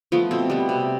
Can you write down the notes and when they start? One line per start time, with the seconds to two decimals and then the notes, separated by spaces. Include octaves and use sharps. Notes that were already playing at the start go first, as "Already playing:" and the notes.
0.12 F3 A3 B3
0.31 B2 C4
0.50 G3 B3
0.69 C3